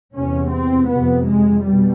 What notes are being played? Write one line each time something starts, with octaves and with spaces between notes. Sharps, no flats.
E2 C3 C#4
C4
F2 C3 B3
G#3
B2 G3